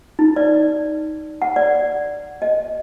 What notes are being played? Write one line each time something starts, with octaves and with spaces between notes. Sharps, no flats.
D#4
D5
F#5
D5
D#5